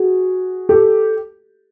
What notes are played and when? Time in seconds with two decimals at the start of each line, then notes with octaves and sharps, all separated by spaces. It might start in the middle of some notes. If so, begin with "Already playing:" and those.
Already playing: F#4 G#4
0.69 G4 A4